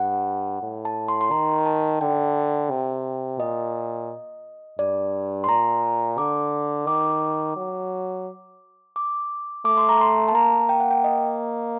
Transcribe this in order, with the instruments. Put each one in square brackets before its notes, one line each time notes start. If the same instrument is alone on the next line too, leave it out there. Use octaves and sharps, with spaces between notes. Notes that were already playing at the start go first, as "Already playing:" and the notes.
Already playing: [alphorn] G2 [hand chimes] F#5
[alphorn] A2
[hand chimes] A5
C6
C6
[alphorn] D#3 [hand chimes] A#5
[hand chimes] A5
[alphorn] D3 [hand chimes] G5
[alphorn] C3
[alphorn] A#2 [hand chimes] D#5
[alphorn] G2 [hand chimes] D5
[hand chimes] C6
[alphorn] A#2 [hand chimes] A#5
[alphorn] D3 [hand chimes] D6
[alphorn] D#3 [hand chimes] D6
[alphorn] F#3
[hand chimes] D6
[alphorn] A3 [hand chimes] D6
[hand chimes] C6
A#5
C6
A5
[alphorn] A#3 [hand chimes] A#5
[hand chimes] G5
F#5
G5
D#5